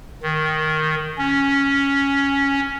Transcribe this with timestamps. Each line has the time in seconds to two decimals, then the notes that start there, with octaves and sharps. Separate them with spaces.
0.23 D#3
1.18 C#4